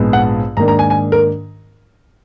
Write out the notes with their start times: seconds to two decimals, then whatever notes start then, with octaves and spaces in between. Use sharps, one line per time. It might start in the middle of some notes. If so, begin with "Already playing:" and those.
Already playing: A#1 G#2 F3 G#3 B3
0.13 F#5
0.57 G#2 D#3 A#3 D4 A#5
0.68 A#5
0.79 G#5
0.90 G#5
1.12 A#4